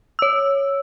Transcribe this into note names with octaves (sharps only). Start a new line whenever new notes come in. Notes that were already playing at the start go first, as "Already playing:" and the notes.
C#5 E6